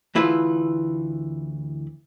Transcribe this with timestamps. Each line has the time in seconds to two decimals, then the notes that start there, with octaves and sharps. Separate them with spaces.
0.15 D2 E3 E4 F4 G#4 B4